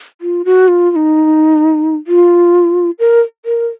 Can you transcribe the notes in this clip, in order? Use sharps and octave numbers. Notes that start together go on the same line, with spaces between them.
F4
F#4
F4
F4
D#4
F4
A#4
A#4